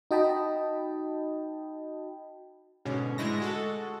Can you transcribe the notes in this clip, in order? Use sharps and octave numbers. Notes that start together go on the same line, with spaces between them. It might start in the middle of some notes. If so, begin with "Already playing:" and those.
D#4 F#4 D#5 G5 A5 B5
G#2 B2 D3 C#4
G#2 D3 G#3 A3 E4 A#6
G#3 F#4 A4